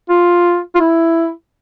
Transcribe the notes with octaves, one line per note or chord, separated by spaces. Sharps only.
F4
F4
E4